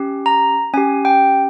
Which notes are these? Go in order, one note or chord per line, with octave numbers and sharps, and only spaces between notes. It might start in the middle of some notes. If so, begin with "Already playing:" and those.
Already playing: C#4 G4
A#5
C#4 G4 G#5
G5